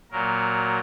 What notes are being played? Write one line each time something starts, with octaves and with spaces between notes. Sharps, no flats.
A#2 F#3 A#4